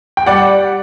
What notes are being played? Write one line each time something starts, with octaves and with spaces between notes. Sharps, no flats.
G5
G3 D5 F#5